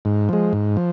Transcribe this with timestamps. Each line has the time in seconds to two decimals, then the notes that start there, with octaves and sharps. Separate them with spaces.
0.05 G#2
0.29 F3 G#3
0.53 G#2
0.77 F3